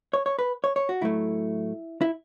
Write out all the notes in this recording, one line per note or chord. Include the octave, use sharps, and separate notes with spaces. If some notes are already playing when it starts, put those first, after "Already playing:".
C#5
C#5
B4
C#5
C#5
F#4
A2 F#3 A3 E4
E4